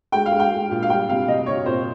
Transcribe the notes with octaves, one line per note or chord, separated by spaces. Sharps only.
G#3 G5
F5
G#3
G5
G#3
A#2
F5
G3 G5
C3 F5
C3 D#5
C3 C#5
A#2 C5